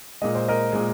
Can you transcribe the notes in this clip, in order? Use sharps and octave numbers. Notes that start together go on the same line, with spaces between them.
A#2 G#3 D#5
C5
A#4 D#5
A#2 G#3